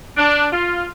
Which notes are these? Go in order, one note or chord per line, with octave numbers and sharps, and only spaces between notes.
D4
F4